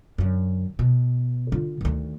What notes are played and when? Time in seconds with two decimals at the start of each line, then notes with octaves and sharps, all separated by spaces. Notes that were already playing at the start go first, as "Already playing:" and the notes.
0.18 F#2 D3
0.79 B2
1.52 D3 F4
1.81 D2 D#3